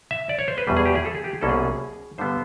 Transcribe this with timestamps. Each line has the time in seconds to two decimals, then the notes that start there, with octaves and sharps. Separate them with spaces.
0.11 E5
0.29 D5
0.39 C#5
0.48 C5
0.58 B4
0.67 E2 B2 G3
0.77 G#4
0.85 G4
0.95 G#4
1.05 A4
1.15 G#4
1.24 G4
1.33 G#4
1.41 C2 B2 F#3 A#3 C#4 A4
1.49 G#4
2.18 G2 D3 G3 B3 C5